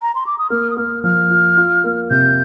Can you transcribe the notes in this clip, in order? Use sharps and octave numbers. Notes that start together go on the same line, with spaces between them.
A#5
C6
D6
D#6
A#3 F6
D#6
A#3 F6
F3 F6
F4
F4
A#3
C3 G6